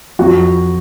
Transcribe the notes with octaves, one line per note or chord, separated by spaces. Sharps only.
F2 F#4